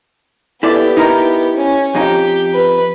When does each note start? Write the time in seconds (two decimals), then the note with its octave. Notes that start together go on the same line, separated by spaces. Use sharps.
0.63 B3 E4 G4 A4 D5
0.97 D#4 E4 A#4
1.56 C#4
1.95 F2 D#4 G4
2.54 B4